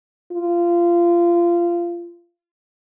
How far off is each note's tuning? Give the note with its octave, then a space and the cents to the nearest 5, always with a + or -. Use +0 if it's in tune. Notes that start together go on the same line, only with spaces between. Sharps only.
F4 -20